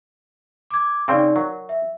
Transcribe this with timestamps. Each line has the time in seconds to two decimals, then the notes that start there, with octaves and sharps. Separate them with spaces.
0.71 D6 G#6
1.08 C#3 C4 D#4 D5 G5
1.36 F#3 A#4
1.69 E5